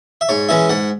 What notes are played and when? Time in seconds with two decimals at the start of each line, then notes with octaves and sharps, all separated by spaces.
0.21 E5
0.29 G#2 C#5
0.49 E3 G#3 C#4 E5
0.69 G#2 F#5